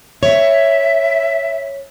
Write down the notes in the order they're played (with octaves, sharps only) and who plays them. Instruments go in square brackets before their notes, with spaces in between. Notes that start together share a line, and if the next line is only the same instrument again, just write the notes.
[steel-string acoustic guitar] C#5 [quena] E5